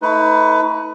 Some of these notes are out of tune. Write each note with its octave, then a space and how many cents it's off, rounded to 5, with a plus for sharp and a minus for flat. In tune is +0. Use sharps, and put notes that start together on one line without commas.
A3 +15 D#4 +45 B4 +20